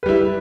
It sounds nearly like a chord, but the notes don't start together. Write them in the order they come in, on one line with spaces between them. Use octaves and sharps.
B4 G3 E4